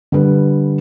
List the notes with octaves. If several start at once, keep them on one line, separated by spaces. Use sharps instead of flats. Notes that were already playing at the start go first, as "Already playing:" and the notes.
D3 G3 B4